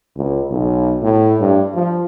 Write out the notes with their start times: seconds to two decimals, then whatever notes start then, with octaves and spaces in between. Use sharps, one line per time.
0.16 C#2
0.51 B1
1.02 A2
1.41 G2
1.75 F3